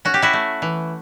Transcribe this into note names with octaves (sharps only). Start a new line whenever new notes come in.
C#4 F#4
G4
E4 F#4
A3
E3